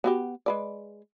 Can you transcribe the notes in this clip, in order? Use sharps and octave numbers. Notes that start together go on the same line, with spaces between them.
B3 F#4 G4
G#3 B4 D5